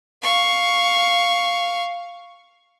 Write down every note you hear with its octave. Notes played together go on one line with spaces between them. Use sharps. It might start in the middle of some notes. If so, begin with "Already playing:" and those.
F5 C#6